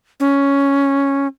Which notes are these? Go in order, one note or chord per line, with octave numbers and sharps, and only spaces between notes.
C#4